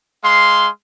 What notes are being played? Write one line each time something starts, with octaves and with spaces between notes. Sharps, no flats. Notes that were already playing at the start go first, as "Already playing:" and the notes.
G#3 F5 C6